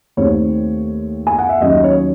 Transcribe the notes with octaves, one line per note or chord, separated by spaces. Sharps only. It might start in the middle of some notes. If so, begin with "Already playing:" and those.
D#2 D#3 A3 C4 C#5
G#5
F#5
E5
D#2 D#3 F#3 C#4 D#5
C#5